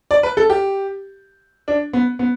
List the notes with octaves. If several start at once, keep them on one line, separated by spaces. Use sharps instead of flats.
D5
B4
A4
G4
D4
B3
B3